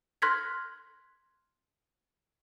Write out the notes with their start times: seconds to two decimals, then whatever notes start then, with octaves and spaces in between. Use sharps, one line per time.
0.22 C6 F6 F#6 G#6 A#6 B6